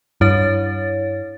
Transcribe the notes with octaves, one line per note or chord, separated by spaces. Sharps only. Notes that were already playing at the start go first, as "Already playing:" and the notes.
G2 E4 C#5 A6